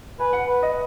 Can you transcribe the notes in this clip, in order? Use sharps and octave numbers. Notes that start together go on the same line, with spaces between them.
B4 G#5
F#5
B4
D#5